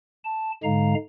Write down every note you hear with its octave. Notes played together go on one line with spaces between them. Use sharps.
A5
G#2 D3 G#3 F5 A#5